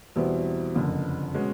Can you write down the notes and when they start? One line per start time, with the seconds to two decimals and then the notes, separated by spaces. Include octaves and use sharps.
0.16 E2 B2 G3 C4 E4
0.75 F#1 F2 D3
1.34 B2 G#3 C#4